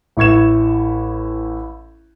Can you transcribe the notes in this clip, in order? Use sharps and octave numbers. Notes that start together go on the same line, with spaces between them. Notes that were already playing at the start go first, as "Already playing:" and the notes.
A1 E4 C#6 G#6 E7